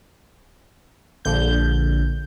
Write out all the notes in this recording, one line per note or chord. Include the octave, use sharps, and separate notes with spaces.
A#1 D3 G6